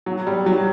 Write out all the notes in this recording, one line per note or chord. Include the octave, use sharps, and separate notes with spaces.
F#3
G3
F#3